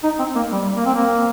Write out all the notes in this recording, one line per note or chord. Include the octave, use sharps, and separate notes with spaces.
D#4
C4
A#3
G3
A#3
C4
A#3